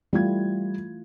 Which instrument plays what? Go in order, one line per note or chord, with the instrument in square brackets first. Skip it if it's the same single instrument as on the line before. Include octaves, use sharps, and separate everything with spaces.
[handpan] E3 A3 F4 [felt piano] G3 G#6